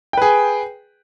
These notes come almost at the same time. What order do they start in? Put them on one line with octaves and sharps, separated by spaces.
G5 B4 G#4